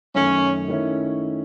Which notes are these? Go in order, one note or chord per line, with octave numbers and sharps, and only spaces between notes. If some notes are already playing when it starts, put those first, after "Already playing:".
F#2 D#3 A3 C#4
D#3 A3 C#4 E4